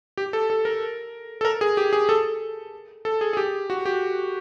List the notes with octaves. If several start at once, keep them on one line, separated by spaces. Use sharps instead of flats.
G4
A4
A4
A#4
A4
A#4
G#4
G4
G#4
A4
A4
G#4
G#4
G4
F#4
G4